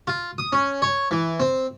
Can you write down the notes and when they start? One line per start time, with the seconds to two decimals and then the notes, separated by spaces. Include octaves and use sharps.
0.07 F4
0.38 D#6
0.52 C#4
0.82 C#5
1.11 E3
1.40 C4